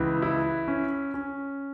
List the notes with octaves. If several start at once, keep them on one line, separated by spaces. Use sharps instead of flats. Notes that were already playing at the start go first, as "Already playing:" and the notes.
Already playing: C#2 E3
E4
C#4
C#4